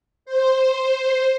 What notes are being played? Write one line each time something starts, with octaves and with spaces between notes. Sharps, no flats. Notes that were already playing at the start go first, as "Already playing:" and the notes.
C5